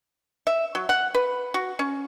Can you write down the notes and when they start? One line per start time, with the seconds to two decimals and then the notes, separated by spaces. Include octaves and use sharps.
0.47 E5
0.75 F#3
0.89 F#5
1.15 B4
1.54 F#4
1.79 C#4